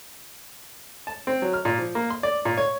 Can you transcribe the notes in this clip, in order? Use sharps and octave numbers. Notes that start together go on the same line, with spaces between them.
A5
C4
F#3
F6
A#2
F3
A#3
C6
D5
A#2
C#5